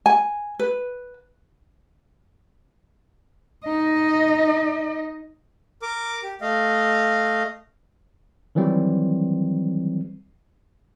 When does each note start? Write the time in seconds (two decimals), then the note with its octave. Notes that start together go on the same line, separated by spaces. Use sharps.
0.06 G#5
0.59 B4
3.65 D#4 D#5
5.82 A#4 D6
6.23 G4
6.41 A3 D#5 F5
8.55 D#3 E3 F#3 G3 C4